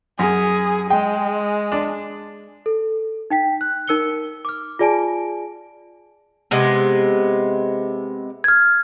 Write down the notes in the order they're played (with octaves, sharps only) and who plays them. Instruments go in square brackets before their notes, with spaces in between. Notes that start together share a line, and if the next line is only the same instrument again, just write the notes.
[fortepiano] F#2 [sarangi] G#4
[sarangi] G#3 [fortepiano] G5
[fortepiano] D4
[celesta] A4
D#4 G5 B6
F#6
D#4 A#4 E6 C#7 G7
D6 F6
F4 G#4 D5 G#5 A5 D7
[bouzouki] C3 G#3 B3
[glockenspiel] F6 G#6